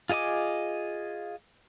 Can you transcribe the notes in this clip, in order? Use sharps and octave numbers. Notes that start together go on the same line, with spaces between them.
F4 G#4 D#5 G#5 D6